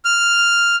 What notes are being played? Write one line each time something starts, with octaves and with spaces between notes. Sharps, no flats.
F6